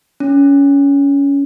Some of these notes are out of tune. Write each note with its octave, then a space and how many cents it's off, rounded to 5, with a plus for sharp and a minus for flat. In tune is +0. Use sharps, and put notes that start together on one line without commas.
C#4 +20